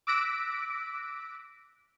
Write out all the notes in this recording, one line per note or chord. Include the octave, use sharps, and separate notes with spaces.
D6 E6 F#6 A#6 B6 D7